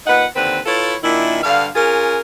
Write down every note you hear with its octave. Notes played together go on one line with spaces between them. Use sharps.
A#2 D#4 B4 F#5
D#2 D3 C4 B4
E4 F4 A4 B4 C#5
A#2 D#3 D4 E4
G2 D3 F5
C#4 F4 G#4 A#4